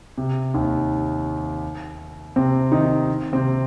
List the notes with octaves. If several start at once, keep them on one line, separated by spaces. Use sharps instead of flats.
C3
D#2 D#3
C3 C4
D#3 D#4
C3 C4